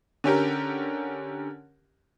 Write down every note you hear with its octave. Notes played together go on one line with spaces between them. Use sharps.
D3 C#4 G4 A#4